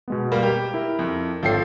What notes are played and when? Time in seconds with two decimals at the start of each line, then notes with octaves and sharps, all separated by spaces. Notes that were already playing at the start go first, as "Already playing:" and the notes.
0.08 B2 G#3 B3
0.32 G3 A#3
0.43 G4
0.74 E4 A#4
0.99 F2
1.43 G#1 F3 A4 C#5 G5 C7